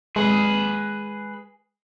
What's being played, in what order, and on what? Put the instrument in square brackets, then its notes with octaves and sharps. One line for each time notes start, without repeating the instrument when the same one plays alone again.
[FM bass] G#3 [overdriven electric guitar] G#4 B4